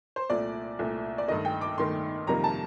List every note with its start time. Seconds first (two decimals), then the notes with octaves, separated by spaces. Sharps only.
0.16 C5
0.30 C2 A#2 A3 D5
0.79 C2 A#2 A3
1.18 D5
1.28 G2 D#3 A3 D#5
1.45 G5
1.61 D6
1.77 G2 D#3 A3 C6
2.27 F2 C3 D#3 G3 A#3 A#5
2.44 A5